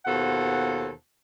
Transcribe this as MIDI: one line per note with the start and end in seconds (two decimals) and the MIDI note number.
0.06 0.91 39
0.06 0.91 47
0.06 0.91 65
0.06 0.91 69
0.06 0.91 72
0.06 0.91 78